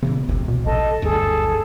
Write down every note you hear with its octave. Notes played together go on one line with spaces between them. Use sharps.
A#2 C#3 E3 B3
G1 C#2 C3
B2
A#1 A4 D#5 A5
F#1 D2 G2 G#4 A4